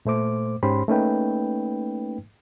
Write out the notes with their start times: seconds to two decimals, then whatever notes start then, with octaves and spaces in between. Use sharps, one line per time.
0.05 A#2 A3 C5 D6
0.63 G#2 C#4 G4 C5 B5 C6
0.88 A3 A#3 C#4 D#4 B4 G5